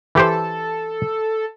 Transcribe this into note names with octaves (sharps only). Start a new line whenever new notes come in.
E3 G4 A4 C5